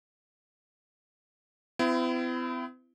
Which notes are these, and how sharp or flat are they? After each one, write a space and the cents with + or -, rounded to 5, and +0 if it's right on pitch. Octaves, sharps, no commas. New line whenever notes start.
C4 -45 E4 +30